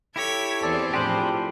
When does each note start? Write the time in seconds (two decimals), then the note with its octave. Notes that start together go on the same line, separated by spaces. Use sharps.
0.16 E4 G4 A4 C#5 G#6 B6
0.62 E2 E3 C4 G#4 A4 D5
0.94 A2 F3 D4 G4 G#4 C5 B5